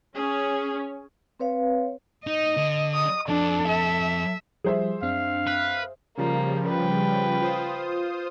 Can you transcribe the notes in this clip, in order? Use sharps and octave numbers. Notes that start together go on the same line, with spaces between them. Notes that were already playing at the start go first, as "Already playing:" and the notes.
C#4 G#4
C4 B4 C#5 F5
D#4 D#5
D3
D#6
F2 D4 A4
E5
F3 G3 G#4 C5 E5
F#2 C4 D4 F5
B4
C#3 F3 G3 A#3
B4 G5
F4 C5 D#6